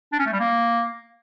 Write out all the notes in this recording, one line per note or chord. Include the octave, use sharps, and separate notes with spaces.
D4
C#4
A3
G3
A#3